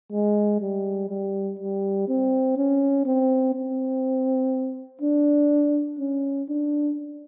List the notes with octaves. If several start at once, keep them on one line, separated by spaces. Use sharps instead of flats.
G#3
G3
G3
G3
C4
C#4
C4
C4
D4
C#4
D4